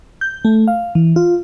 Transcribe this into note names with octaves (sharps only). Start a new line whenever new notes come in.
G6
A3
F5
E3
F4